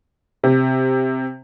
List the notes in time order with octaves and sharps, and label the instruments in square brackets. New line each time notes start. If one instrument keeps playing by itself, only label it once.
[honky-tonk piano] C3